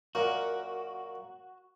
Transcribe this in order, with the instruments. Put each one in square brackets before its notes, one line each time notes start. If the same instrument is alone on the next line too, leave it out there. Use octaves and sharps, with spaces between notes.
[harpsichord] F#2 A#2 [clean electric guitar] F#4